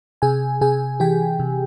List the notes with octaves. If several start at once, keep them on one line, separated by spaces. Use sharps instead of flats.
C3 G#4 G#5
C3 G#4 G#5
E3 G4 G5
C3